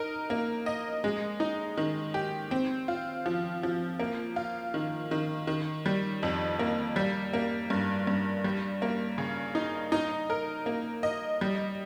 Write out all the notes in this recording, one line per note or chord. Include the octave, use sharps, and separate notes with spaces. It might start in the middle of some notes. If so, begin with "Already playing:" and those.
Already playing: D#4 A#4
A#3
D#5
G#3
D#4
D#3
G4
C4
F4
F3
F3
A#3
F4
D#3
D#3
D#3
G3
F2
A#3
G3
A#3
G2
G2
G3
A#3
C#3
D#4
D#4
A#4
A#3
D#5
G3